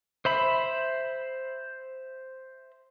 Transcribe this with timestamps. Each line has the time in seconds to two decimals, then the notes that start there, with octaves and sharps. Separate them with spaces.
0.25 C5 E5 B5